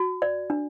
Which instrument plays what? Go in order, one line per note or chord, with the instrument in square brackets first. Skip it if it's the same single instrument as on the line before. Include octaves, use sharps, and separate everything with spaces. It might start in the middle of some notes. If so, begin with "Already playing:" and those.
Already playing: [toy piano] F#4
D5
D4